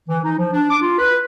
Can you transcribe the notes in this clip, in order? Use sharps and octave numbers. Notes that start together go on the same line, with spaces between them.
E3
D#4
F3
D4
D6
F4
B4